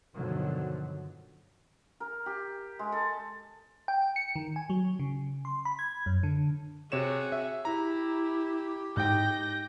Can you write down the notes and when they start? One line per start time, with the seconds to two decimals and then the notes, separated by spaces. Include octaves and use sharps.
0.15 G2 B2 D3 D#3 F3 F#3
2.00 A#4
2.26 G4
2.79 G#3
2.92 A4
3.88 G5
4.16 C#7
4.36 D#3
4.56 G#5
4.70 F#3
4.99 C#3
5.45 C6
5.65 B5
5.79 G#6
6.06 F#2
6.23 D3
6.92 C3 F#4 G#4 C#5 E7
7.32 E5
7.65 E4 G4 A#5
8.97 G#2 D#4 G5 G6 A#6